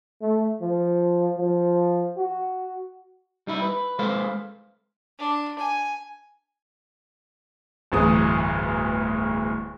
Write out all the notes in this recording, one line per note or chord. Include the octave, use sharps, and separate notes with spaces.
A3
F3
F3
F#4
G3 D#4 E4
B4
G#3 A4 B4 C5 F5
D4
G#5
D1 G1 D2 E3 G#4 D#6